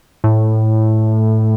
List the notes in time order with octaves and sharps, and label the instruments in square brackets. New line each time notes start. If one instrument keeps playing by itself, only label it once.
[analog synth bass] A2